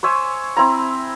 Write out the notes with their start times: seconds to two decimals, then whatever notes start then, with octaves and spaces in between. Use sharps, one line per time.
0.03 C5 C#5 E5 G#5
0.57 C4 E4 A#5